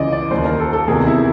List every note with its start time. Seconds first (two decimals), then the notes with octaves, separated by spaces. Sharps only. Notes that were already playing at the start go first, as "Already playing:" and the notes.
Already playing: C#2 C#3 E3 D5 D#5
0.12 D5
0.31 D#2 D#3 C5
0.45 A#4
0.60 A4
0.73 A4
0.88 E2 C3 D#3 G#4
1.07 E4